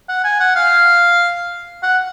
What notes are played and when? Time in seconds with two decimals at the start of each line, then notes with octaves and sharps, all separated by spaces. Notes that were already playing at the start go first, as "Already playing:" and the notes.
0.09 F#5
0.24 G#5
0.40 F#5
0.56 F5
1.83 F#5